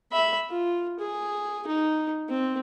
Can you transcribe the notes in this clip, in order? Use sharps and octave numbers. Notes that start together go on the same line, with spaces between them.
E5 B5
F4
G#4
D#4
C4